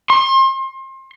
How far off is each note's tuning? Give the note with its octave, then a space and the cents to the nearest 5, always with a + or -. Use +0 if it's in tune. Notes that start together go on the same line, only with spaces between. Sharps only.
C6 +35